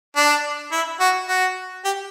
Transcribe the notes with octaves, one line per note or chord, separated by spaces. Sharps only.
D4
E4
F#4
F#4
G4